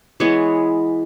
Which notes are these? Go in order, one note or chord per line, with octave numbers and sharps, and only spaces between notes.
E3 G#3 B3 C#5